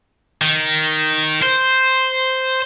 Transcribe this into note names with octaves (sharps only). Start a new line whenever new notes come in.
D#3
C5